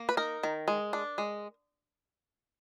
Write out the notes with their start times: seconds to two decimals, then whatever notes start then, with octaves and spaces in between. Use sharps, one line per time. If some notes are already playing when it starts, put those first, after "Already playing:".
Already playing: A#3
0.09 B4
0.17 D#4 A#4
0.43 D#3
0.68 G#3
0.93 D4
1.18 G#3